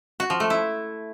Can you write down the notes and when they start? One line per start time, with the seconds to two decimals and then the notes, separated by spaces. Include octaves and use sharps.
0.20 F#4
0.30 F3
0.40 A3
0.50 E4